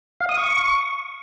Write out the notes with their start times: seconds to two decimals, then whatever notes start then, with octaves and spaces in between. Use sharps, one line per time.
0.20 F5
0.29 D#6
0.37 C#6